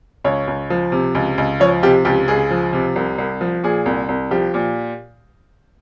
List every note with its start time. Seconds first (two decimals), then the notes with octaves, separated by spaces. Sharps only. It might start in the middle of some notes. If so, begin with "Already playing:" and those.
0.24 C#2 C#5
0.47 C#2
0.70 F3
0.92 C3
1.15 C#2
1.38 C#2
1.60 F3 C#5
1.82 C3 G4
2.05 C#2 G4
2.28 C#2 G#4
2.51 F3
2.73 C3
2.96 C2
3.18 C2
3.41 F3
3.64 A#2 G#4
3.86 C2
4.09 C2
4.31 F3 G4
4.54 A#2